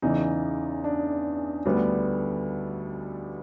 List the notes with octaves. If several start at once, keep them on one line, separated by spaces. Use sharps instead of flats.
E2 C#3 E3 D#4
D4
D2 D3 G3 B3